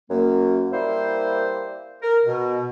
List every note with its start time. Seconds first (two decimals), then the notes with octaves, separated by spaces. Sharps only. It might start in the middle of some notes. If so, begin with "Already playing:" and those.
0.10 F#2 A#3
0.72 G3 A#3 E4 C5
2.02 A#4
2.25 B2